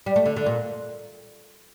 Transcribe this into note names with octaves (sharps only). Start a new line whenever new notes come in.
G3
A3
D3
D3
A#2